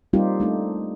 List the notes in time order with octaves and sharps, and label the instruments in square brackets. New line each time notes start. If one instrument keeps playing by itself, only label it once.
[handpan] G3 A#3 C4 D#4 F4 G4
A3 D4 D#4